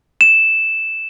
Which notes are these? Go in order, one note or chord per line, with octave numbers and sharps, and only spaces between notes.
E7